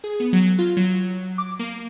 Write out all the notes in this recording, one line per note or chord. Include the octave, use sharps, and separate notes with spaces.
G#4
B3
F#3
F4
F#3
D6
A#3